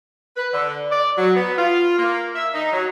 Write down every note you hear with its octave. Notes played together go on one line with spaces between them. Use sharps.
B4
D3
D5
F#3
B3
F4
A#3
E5
D#4
F#3